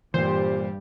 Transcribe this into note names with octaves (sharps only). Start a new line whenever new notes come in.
G2 A#2 E3 G3 G4 C5